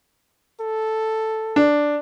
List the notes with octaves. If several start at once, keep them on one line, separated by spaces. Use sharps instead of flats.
A4
D4